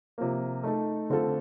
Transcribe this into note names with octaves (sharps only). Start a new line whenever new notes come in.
C3 F3 A#3
A3 D#4 A4
D3 A3 C4 F4 A4